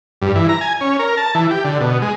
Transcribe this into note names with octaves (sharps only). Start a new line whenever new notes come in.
G2
E3
A#5
G#5
C#4
A#4
A5
E3
G4
D3
B2
G#3